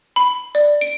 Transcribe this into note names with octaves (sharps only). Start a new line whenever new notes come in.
B5
D5
D7